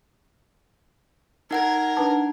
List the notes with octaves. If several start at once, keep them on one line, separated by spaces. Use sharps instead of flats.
D#4 A#4 F#5 G#6
D4 B4 A5